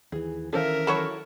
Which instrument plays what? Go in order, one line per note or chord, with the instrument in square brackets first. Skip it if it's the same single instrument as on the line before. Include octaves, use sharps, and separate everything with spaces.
[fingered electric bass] D#2 E3 [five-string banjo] G#4
[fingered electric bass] D#3 E3 C#4 [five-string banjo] A4 C5 F5 [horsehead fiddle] A#4 E5
[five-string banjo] F#3 A4 B5 [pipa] E4 F#4 C#5